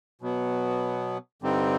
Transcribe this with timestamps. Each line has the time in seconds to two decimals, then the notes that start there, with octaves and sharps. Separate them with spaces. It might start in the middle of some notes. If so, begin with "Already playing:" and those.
0.21 B2 F#3 B3
1.42 G2 D3 G3 C4 D#4